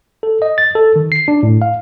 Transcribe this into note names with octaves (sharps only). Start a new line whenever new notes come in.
A4
D#5
A6
A4
D#3
C7
D4
A2
F5